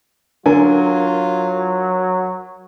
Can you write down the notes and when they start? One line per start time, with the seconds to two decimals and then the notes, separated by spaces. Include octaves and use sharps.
0.46 D3 F#3 F4 A#4 G#5